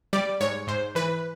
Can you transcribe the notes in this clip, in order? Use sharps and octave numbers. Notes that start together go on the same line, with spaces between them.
G3 D5
G#2 C#5
G#2 C5
E3 B4